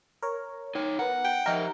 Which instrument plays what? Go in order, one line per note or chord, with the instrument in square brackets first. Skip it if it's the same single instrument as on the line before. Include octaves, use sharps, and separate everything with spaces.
[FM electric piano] A#4 C#5
[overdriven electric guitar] D#4 C#5
[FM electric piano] B3 A#4 [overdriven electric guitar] F#5
[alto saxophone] G5
[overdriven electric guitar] F3 E5 [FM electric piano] D#4 G4 A#4